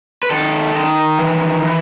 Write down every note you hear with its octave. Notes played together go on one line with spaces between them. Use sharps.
B4
D#3 A4
D#3
E3
E3